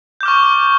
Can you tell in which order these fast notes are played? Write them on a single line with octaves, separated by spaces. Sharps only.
G6 D6 F6 C#6